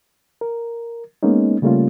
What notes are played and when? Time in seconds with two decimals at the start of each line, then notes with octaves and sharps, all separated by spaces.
0.41 A#4
1.23 G#3 A#3 B3 C#4 D#4
1.62 C#3 G3 A3 A#3 C#4 F4